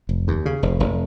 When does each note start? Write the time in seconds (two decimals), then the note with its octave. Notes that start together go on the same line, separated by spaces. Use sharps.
0.09 F1
0.28 D#2
0.46 C#3
0.63 F1
0.80 F1